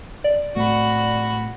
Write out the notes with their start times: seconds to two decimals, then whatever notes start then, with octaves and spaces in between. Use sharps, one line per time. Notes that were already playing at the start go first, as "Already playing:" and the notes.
0.24 D5
0.56 A2 A3 C4 F#4 B5